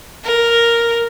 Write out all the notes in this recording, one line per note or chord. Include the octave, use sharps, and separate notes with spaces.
A#4